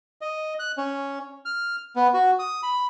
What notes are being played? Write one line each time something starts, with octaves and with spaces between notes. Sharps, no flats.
D#5
F#6
C#4
F6
B3
F#4
D#6
B5